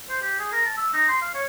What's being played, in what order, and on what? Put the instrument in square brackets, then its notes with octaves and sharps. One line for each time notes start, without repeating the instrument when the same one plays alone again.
[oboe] C5
G4
G#4
A#4
A5
E6
D#4
C6
F5
C#5